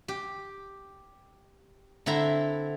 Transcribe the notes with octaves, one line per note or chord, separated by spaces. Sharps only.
G4
D3 C4 E4 E5 A#5